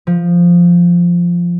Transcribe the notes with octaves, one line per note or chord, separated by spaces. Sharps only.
F3